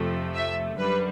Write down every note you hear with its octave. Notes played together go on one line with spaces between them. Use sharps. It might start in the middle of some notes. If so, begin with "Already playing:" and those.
Already playing: F2 C3 F3 A3
E5
F#2 D3 G3 B4